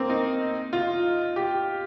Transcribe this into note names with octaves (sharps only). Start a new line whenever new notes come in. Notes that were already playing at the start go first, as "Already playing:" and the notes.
Already playing: A#3 C4
D#4
F4
G4